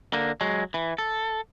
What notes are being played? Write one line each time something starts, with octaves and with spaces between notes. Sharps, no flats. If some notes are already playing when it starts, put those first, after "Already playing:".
D3 A#3
F#3 G#3
E3
A4